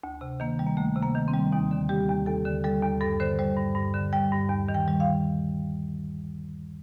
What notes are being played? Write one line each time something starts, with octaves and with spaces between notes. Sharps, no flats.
D2
C3
D#3 A#3
G3
A#3
D2 A3
C3
A#3
D#3
C4
G3
D#2 D#4
D3
G3 G4
D#2
D#2 A4
D3
G3 A4
D#2
G2 A4
D3 C5
G3 C5
G2
G2
D3
G3 G5
G2
D#2
D#3
G5
G3
F5